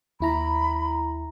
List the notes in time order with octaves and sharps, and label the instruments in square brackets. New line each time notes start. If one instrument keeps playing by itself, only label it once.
[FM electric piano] D#2 E4 A#5 [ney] B5